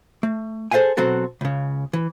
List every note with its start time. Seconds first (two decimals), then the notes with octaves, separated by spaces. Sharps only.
0.23 A3
0.71 G#4 A4 C5 F5 F#5 G#5
0.97 B2 F#3 C4 F#4 A4
1.41 C#2 C#3
1.93 E3